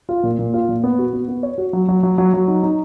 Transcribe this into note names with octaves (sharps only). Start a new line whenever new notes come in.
F4
A#2
A#2
F4
A#2
B3
F#4
B3
B3
C#5
F#4
F#3
F#3
F#3
F#3
F#3
D#4
D#4